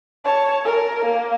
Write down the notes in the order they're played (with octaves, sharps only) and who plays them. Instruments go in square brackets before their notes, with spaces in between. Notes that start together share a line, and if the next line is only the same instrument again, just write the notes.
[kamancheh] C#5 A5
A#4
A#3